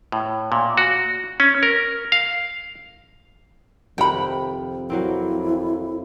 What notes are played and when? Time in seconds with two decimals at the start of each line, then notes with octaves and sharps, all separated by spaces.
0.12 A2
0.52 A#2
0.77 F#4
1.40 C#4
1.63 A#4
2.12 F5
3.98 F2 C3 D#3 F#5 G5 B5
4.90 F#3 A#3 C4 E4